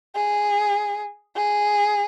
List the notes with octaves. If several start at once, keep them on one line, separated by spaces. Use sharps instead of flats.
G#4
G#4